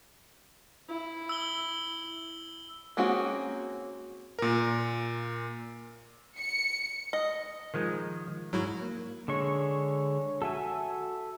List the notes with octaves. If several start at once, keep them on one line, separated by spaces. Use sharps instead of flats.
E4
E6 G7
G#3 A#3 C4 C#4 F#4
A#2 A#4
C#7
D#5
D#3 F3 G#3
G#2 F#3 E4 F#4
A#3
D3 G#3 C#5 C#6
F#4 A4 E5 G#5